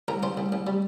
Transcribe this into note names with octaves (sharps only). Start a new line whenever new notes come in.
C2 A#4
C2 C5
C2
C2
G3